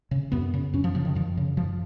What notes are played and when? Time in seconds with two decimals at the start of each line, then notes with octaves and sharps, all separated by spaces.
0.11 C#3
0.32 F#2 B3
0.54 C#3
0.73 F#2 C#4
0.84 F3
0.95 C#3 F3
1.05 D#3
1.15 F#2 F3
1.37 C#3
1.57 F#2 F3